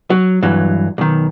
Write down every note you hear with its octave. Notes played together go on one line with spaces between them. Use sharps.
F#3
G2 E3 F#3
B1 D#3